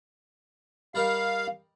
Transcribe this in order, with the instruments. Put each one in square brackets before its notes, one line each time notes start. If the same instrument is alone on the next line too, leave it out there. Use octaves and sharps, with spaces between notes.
[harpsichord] G3 D#4 A#4 [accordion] F5